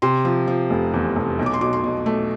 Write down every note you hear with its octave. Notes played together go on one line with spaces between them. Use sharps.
C3 C6
F3
F3
F1
E2
F1
B1
D6
C6
B2 D6
C6
B2
A3